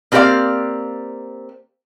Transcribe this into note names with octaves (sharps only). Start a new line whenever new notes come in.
A#3 C4 G4 C5 D5 F5